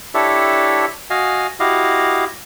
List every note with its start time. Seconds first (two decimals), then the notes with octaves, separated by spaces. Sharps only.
0.14 D4 E4 G4 A4 C#5 E5
1.10 F#4 D#5 F5 G#5
1.60 E4 F#4 G4 D#5 F5